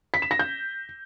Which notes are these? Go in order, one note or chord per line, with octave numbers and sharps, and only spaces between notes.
B6
E7
A#6
G6